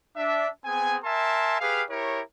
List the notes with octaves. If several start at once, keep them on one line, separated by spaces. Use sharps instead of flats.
D4 E5
B3 C4 G#4 G#5
A#4 E5 G#5 A5 C6
G4 G#4 B4 F5
E4 G4 A#4 C#5